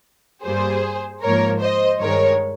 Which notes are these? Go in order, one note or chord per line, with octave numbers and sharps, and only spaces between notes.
G2 G3 A#3 G#4 C5
G#2 F3 A#3 A#4 C#5
C5 D#5
G2 D#3 G#3 A#4 C#5